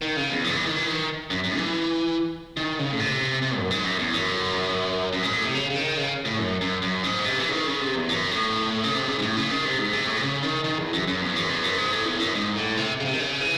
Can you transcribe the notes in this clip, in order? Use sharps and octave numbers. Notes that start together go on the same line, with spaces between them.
D#3
C#3
E2
F#2
E3
D#3
E3
D#3
F#2
F#2
E3
D#3
C#3
A2
C3
C3
F#2
G#2
F#2
E2
F#2
F#2
G#2
A2
C3
C#3
C#3
D#3
C#3
A2
F#2
F#2
F#2
G#2
C3
E3
C#3
D#3
C#3
C3
E2
F#2
A2
C#3
C3
C#3
G#2
A2
C#3
D#3
C3
G#2
C3
A2
C3
C#3
D#3
D#3
E2
F#2
F#2
E2
F#2
E2
F#2
G#2
A2
E2
F#2
G#2
A2
C3
C#3
C3
D#3
C#3
E3